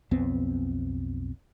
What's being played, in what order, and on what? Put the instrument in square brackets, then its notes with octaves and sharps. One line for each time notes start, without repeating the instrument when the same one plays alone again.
[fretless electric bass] B1 F2 B3 C4